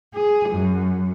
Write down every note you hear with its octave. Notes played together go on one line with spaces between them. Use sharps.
G#4
F#2